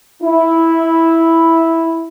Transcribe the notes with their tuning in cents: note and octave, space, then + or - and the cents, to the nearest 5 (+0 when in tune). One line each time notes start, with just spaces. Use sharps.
E4 -5